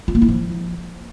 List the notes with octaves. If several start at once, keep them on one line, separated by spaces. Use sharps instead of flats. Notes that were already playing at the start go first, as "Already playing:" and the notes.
F4
A#3
E4
F3